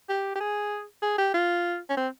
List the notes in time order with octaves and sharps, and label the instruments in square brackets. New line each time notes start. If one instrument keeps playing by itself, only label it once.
[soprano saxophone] G4
G4
G#4
G#4
G4
F4
C#4
C4